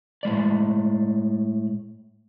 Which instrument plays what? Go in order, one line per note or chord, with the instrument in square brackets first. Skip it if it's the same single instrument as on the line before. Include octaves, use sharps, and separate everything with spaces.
[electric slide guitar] A2 G#3 D5